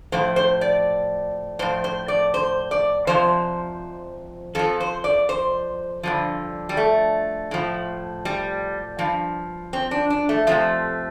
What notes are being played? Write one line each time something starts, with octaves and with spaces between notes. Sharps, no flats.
A2 F3 C5
C5
D5
A2 F3 C5
C5
D5
C5
D5
F2 C3 F3 C5
F2 F3 A4
C5
D5
C5
G2 D3 F3
G3
A3
A2 F3
G3
G2 F3
C4
D4
D4
A3
F2 C3 F3 A3